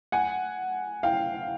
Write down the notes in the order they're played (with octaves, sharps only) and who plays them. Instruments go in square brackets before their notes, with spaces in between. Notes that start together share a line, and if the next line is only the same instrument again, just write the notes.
[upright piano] F#5 G#5
F5 G5